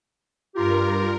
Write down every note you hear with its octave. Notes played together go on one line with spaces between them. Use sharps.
G2 F4 G4 A#4